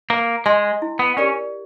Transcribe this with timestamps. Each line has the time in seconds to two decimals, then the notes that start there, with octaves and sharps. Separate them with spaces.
0.10 A#3 B4
0.46 G#3 D#5 G#5 C6
0.82 E4
0.99 B3
1.17 C#4 G4 A#4 D5